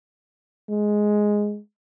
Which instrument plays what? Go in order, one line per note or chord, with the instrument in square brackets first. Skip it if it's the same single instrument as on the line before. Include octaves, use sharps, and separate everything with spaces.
[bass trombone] G#3